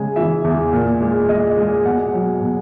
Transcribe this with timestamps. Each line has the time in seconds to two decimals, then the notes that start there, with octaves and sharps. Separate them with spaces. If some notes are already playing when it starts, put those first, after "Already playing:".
Already playing: C#3 G#3 G#5
0.16 E3 E5
0.44 E2
0.73 A#2
1.01 G#3
1.29 G#3 D#5
1.57 G#3
1.85 B2 F#5
2.13 F#3
2.41 B2